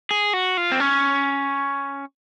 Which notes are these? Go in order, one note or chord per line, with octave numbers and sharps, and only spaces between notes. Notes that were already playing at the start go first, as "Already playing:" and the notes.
G#4
F#4
F4
C4
C#4